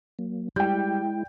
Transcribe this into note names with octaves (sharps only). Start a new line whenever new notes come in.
F#3 A#3
G3 G#3 E4 G5 G6